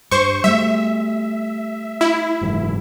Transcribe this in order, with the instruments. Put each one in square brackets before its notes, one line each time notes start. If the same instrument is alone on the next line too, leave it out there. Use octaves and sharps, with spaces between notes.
[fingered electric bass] G2 [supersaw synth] C5 C#6
[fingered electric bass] G3 A3 [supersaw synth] E5
[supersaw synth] E4
[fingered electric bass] F#1 G#2 E3